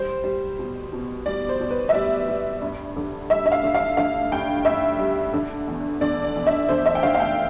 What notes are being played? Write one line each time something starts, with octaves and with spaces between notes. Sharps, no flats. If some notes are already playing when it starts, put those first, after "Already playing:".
Already playing: G3 C5
G3
B2
B2
G3 D5
C5
B2
B4
E5
G3 D5
G3
G2
D3
G3 E5
E5
F5
D3
F5
D3 F5
G2 G5
G2 E5
G3
D3
E2
D3 D5
D5
E2
E5
D3 C5
E5
G5
D3 F5
F5
G5